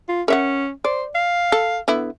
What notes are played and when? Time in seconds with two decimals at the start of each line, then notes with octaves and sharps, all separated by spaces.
0.09 F4
0.28 C#4 A#4 E5 F#5
0.84 C5 D5
1.15 F5
1.52 A4
1.88 D3 B3 E4